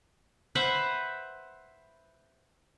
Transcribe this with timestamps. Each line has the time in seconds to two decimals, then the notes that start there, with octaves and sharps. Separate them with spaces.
0.55 B4 C5 E5 F#5